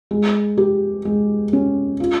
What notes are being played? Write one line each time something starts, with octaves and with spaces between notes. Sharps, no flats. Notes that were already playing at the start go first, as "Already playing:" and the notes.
G#3
G4
G#3
C#4
F4